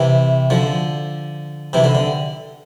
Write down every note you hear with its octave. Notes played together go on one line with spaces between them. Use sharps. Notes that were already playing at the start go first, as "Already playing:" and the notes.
Already playing: C3 E3
D3 F3
C3 E3
D3
D3